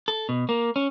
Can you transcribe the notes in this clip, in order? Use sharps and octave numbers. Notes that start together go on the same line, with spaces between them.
A4
B2
A#3
C#4